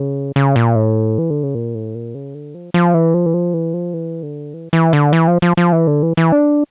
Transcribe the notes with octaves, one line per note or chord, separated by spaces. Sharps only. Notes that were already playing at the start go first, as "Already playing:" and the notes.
Already playing: C#3
C#3
A#2
A2
E3
D3
C#3
A#2
A2
A#2
C#3
D3
F3
F3
E3
F3
E3
F3
E3
F3
E3
D3
E3
E3
D3
E3
F3
F3
F3
E3
D3
E3
E3
D4